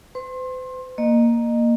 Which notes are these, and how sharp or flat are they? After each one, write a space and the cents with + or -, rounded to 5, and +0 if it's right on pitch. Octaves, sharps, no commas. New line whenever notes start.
C5 -45 C6 +25
A#3 +0 D#5 -25